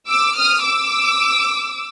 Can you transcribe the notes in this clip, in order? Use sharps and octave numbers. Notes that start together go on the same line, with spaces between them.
D6 E6
D#6 F6
D6 E6